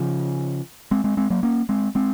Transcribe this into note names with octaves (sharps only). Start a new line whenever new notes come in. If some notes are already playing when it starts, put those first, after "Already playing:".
Already playing: C#3 F3
G#3 C4
G#3 C4
G#3 C4
F#3 A#3
A#3 C#4
G#3 C4
G#3 C4